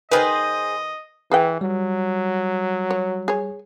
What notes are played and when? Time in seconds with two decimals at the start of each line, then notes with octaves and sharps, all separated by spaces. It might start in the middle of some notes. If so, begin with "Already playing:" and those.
0.11 D#3 G#4 B4 C5 D#5
1.32 E3 G#4 B4 G5
1.61 F#3 G3
2.91 C#5
3.28 G#4 C#5